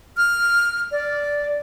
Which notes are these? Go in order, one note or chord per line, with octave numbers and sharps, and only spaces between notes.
F6
D5